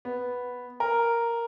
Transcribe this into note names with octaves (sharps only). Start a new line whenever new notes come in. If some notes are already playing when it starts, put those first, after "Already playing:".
B3
A#4